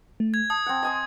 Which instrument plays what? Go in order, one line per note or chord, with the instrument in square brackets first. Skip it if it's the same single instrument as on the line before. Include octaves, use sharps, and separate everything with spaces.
[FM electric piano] A3
[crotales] G#6
[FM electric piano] A5 [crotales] D#6
[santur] C4 F#5
D#5 G#5 C6